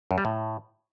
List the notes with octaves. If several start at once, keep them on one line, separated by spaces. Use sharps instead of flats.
F#2
G3
A2